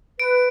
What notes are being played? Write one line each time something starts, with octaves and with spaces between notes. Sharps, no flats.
B4 D7